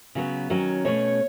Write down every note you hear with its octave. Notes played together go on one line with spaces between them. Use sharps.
C#3 F#3 B3
D#3 F#3 C#4
B2 A3 C#4 C#5